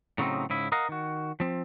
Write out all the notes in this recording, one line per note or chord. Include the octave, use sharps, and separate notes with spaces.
A2 C#3 F#3 B3 C4 D#4
G#2 C#3 E4
A#4 D#5 F5 F#5 A#5
D#3 F#4
F3 C4